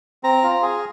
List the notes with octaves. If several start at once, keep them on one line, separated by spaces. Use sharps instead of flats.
C4 A#5
F4
G#4